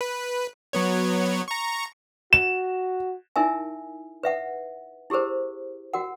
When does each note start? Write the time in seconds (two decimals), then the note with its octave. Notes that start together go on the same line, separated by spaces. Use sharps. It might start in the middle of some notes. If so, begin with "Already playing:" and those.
0.01 B4
0.73 F#3 B3 C#5
1.48 A#5 C#6
2.33 F#4 E7
3.36 D#4 E4 A#4 E5 G#5
4.23 B4 E5 F#5
5.10 E4 G4 G#4 A#4 C5
5.94 F#4 A#4 F#5